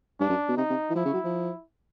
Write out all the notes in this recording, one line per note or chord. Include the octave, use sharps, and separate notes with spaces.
G2 D4
F#2
B2
C3 D#4
C3
E3
F3 E4
C#3
F#3
F3